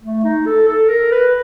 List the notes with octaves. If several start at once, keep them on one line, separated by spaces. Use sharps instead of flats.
A3
D#4
A4
A4
A#4
B4